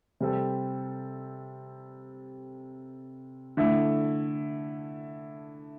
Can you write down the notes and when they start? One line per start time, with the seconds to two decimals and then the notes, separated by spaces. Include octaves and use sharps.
0.20 C3 G3 C4 A4
3.57 D3 A3 E4